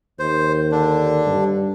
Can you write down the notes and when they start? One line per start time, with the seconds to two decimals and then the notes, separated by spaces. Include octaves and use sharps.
0.19 D#2 C5
0.72 D3 D4
1.27 G2